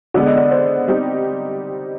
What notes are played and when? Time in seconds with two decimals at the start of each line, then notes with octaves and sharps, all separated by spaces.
0.14 D3 G#3 B3 D5
0.26 D#5
0.37 D5
0.51 C5
0.88 G3 C4 D#4 G4